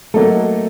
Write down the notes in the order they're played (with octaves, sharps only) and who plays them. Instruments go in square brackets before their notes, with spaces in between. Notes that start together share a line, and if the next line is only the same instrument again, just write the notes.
[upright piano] F#3 A#3 D#4 A4 [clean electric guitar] A3